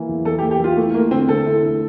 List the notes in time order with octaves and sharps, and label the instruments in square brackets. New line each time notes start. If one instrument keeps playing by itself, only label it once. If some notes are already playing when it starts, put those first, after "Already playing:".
Already playing: [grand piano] E3 A#3
E2
[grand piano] E2 [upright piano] A4
[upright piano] G4
[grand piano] A#3
[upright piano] G4
[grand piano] E3 [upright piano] F4
[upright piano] A3 [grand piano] E4
[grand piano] A3 [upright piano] A#3
[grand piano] D3 [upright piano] C4
[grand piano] D3 [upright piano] A4
[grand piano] E4
A3